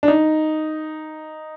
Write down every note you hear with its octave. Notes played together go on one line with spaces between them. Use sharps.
D4
D#4